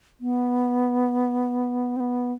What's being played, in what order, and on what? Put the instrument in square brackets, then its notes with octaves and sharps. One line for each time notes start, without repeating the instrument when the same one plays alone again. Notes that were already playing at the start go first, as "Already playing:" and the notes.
[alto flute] B3
C4
B3